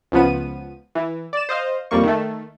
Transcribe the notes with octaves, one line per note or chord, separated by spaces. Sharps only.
C#2 F3 B3 D#7
E3
D5 E7
C5 D#5 F5
F2 G3 A#3 C#6
D#3 A3